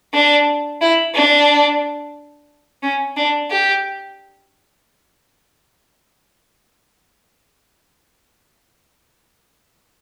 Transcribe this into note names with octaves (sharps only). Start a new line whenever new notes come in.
D4
E4
D4
C#4
D4
G4